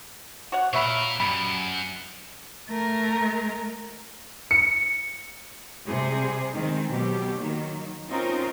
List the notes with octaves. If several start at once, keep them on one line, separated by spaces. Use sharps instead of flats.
F#4 C#5 F#5
A#2 A#4 C#5 E5 B5
F#2 G3 B5
A3 A#4
C#7
C3 G3 G#4 C5
D#3 G#3 C4
B2 F#3 G4
D#3 F#3 A#3
C4 C#4 D#4 F4 A#4 C5